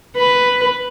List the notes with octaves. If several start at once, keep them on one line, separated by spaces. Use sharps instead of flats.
B4